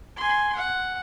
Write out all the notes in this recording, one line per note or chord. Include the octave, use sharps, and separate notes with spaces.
G#5 C6
F#5